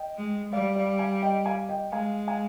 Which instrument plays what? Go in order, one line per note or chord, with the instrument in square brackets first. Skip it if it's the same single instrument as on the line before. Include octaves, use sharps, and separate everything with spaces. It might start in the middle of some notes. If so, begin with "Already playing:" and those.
Already playing: [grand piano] D#5 G5
[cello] G#3
[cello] G3 [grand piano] D5 F5
[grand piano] D5 F5
F5 G#5
D#5 G5
F5 G#5
D#5 G5
[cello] G#3 [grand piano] F5 G#5
[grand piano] F5 G#5